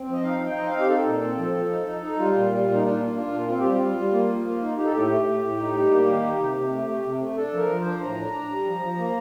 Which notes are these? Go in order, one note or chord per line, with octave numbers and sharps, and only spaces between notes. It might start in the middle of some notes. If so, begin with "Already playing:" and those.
Already playing: C4
F3 D#5
D#4 F5
D#4 G5
C4 D#5
F5
D#4
G4
D#4 A4
A#2
C4
F3
F3
D#4
D#4
D#4
G3 F4
A#2
G3
A#2
D#4
D4 F4
A#3
D4 F4
A#2
C4 F4
G3 G4
F4
G3
G3
A#3
F3
A#3
D#4
D#4 G4
A4
A2 G4
A3
A3
A2
D#4
G3
A#3
D#3
D#4
C3
C3
A3
A3
C3
A3
D4 A4
F3
A#4
F3
C5
D4
A2 A#5
D4
D4
G3
F3
F3
A#3